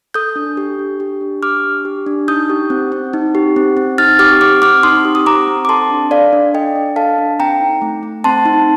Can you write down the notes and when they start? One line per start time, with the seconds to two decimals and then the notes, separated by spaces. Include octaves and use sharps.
0.14 A4 D#6 G6
0.36 D4
0.57 G4
0.79 D4
1.00 G4
1.21 D4
1.43 G4 D6 F6
1.64 D4
1.85 G4
2.06 D4
2.28 D#4 D#6 G6
2.50 G4
2.70 C4
2.92 C4
3.13 D#4
3.35 G4
3.56 C4
3.77 C4
3.98 D#4 F6 A6
4.19 G4 D6 F6
4.41 C4 D6 F6
4.62 C4 D6 F6
4.83 D#4 C6 D#6
5.05 G4
5.15 D#6
5.26 C4 A#5 D6
5.48 C4
5.65 D6
5.69 A4 A5 C6
5.90 D4
6.11 A4 D5 F5
6.33 D4
6.54 A4 D#5 G5
6.75 D4
6.96 A4 F5 A5
7.18 D4
7.39 C4 G5 A#5
7.61 D#4
7.82 A3
8.03 A3
8.24 C4 A5 C6
8.46 D#4